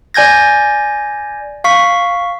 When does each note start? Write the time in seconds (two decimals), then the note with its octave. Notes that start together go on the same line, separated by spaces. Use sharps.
0.14 D5 G#5 G6 G#6 A#6
1.64 F5 C#6 B6